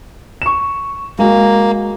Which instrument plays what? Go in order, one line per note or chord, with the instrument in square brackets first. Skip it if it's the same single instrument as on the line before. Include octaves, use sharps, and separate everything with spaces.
[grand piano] C#6 E7
[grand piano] G#3 F#4 [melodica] A#3